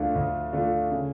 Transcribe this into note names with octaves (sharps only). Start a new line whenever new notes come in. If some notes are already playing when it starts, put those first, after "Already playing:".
Already playing: D2 D3 A3 D4 F4
D2
D3 A3 D4 F4
C#3